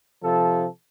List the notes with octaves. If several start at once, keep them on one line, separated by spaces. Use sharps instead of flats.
C3 F3 A4